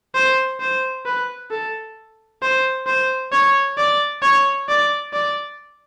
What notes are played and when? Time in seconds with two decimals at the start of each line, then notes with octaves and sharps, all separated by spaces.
0.15 C5
0.60 C5
1.06 B4
1.51 A4
2.42 C5
2.87 C5
3.32 C#5
3.78 D5
4.23 C#5
4.69 D5
5.13 D5